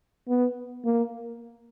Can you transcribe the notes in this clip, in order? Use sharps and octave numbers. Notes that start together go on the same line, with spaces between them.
B3
A#3